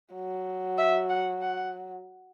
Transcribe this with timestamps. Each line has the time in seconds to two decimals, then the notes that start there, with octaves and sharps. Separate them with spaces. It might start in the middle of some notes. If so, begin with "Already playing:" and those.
0.14 F#3
0.78 E5
1.09 F#5
1.42 F#5